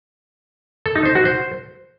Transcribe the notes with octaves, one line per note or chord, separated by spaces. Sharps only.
A4
D#4
C5
F#4
C5